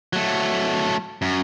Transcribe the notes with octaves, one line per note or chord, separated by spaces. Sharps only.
F#3 A3
F#2